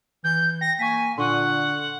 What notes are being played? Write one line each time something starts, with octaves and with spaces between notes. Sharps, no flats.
E3 G6
G5 A#6
A#3 G#5 C#6 B6
A#2 D3 F#5 C6 C#6 F#6